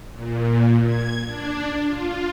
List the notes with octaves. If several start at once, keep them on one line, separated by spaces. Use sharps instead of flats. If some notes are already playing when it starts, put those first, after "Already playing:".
A#2
G#6
D4
F4